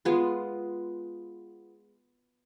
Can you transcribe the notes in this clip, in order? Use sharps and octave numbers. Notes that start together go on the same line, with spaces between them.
G#3 B3 F4